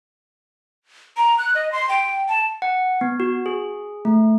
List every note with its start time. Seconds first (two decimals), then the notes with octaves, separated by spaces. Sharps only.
1.17 A#5
1.38 F#6
1.55 D#5
1.72 C6
1.89 G5
2.29 A5
2.62 F#5
3.01 B3
3.20 F#4
3.46 G#4
4.05 A3